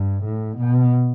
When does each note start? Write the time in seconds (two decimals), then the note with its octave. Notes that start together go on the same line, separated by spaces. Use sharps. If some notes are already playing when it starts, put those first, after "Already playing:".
Already playing: G2
0.24 A2
0.58 B2